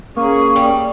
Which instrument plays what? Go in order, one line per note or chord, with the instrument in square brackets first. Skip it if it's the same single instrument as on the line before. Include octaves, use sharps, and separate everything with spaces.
[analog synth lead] A#3 [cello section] C#4 G#4 [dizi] C#6
[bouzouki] G3